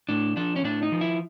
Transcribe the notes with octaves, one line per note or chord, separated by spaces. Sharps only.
A2 D4
F3 D4
C#4
A2 D4
D#4
F3
E4